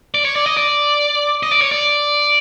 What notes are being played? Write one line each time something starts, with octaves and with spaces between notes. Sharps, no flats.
D5
C#5
D5
D#5
D5
D#5
D5
C#5
D5